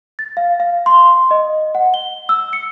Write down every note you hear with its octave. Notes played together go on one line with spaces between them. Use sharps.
A6
F5
F5
C6
D#5
F#5
G7
E6
C#7